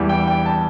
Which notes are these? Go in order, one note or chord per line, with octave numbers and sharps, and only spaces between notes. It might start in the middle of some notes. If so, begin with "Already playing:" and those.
Already playing: E2 E3 G3
G5
G5
A5